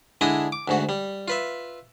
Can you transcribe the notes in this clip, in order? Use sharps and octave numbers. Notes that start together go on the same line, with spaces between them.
D3 G#3 D4 E4 D#5 D#6
D6
D2 G#2 F#4
G3
F4 B4 E5